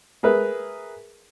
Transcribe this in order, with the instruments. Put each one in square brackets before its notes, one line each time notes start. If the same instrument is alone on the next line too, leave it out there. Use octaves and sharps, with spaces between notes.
[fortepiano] G#4 A#4 B4 E5